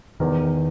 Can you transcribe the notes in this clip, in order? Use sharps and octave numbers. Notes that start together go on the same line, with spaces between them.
E2 D#3